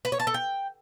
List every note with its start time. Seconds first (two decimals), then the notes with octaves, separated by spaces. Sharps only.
0.05 B4
0.12 C#5
0.20 A5
0.27 A4
0.34 G5